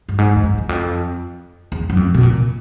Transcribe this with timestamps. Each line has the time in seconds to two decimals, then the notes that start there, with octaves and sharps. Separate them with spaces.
0.09 G2
0.18 G#2
0.36 F2
0.43 F#2
0.58 E2
0.69 F2
1.72 E2
1.90 F#2
1.97 F2
2.14 B2
2.23 A#2